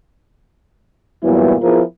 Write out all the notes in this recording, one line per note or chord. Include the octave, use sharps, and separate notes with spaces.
E2 G2 A#2 F#3 B3 E4
F3 B3 E4 F4 G#4 A#4